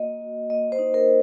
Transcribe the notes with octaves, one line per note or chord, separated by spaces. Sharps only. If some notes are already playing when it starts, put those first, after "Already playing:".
Already playing: A#3 F#4 D#5
F#4
A#3 D#5
C5
D#4
A#4